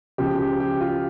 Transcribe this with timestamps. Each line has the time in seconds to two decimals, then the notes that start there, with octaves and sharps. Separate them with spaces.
0.18 C#2 C#3 F3 G4
0.39 G4
0.60 G4
0.81 F4